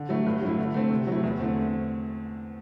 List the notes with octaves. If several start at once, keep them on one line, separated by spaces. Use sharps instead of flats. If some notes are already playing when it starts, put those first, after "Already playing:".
Already playing: D3
F#3 A3 E4
G2
F#3 A3 E4
D3
A3 C4
C3
F#3 A3 E4
E2
D3 A3 C4